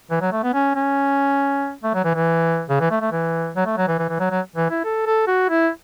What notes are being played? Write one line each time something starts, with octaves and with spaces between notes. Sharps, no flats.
E3
F#3
A3
B3
C#4
C#4
A3
F#3
E3
E3
C#3
E3
A3
A3
E3
F#3
A3
F#3
E3
E3
E3
F#3
F#3
E3
E4
A4
A4
F#4
E4